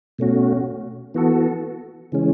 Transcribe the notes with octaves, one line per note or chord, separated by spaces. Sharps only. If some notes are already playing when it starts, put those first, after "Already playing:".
B2 A3 C#4 F#4
E3 B3 F#4 A4
C#3 E3 G#3 C#4